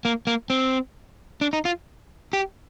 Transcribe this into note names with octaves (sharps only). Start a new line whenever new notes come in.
A#3
A#3
C4
D4
D#4
F4
G4